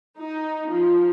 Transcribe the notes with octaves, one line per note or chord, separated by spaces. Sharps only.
D#4
F3